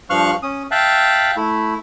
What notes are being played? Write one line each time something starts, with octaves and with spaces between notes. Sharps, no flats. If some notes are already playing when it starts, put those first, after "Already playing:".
G2 F3 F5 C#6 F6 F#6
C#4 D#6
E5 F5 G5 A5 F#6
A3 E4